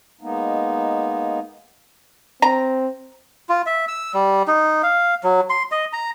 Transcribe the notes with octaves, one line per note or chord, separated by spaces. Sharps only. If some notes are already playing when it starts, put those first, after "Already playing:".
G#3 A#3 B3 D#4
C4 A#5
F4
E5
E6
G3
D#4
F5
F#3
C6
D#5
A#5